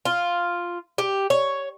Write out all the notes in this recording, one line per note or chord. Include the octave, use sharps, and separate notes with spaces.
F4
G4
C#5